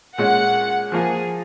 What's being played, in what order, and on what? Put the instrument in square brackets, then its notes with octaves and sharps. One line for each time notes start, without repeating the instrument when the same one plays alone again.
[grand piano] A#2 G#3 C#4 [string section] F#5
[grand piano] F3 A#3 F4 [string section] G#4